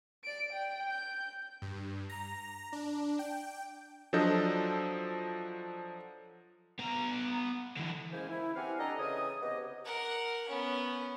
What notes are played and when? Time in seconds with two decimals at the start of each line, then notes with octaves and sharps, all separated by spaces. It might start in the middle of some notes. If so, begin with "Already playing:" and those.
0.24 D5 D7
0.52 G5
0.89 G6
1.62 G2
2.09 A#5
2.73 D4
3.19 G5
4.13 F3 F#3 D4 A4 D#5 G6
6.79 B3 A#5
7.77 D3 E3
8.12 G#3 A#3 C#4 E4 C5 G#5
8.29 E4
8.56 C4 G4 B4 F5 F#5 G#5
8.79 D4 G4 A4 D5 D#5 A#5
8.99 C#3 E3 D#5 G#5 D#6
9.42 C3 B3 G4 D#5
9.85 A#4 F#5
10.48 B3 C#4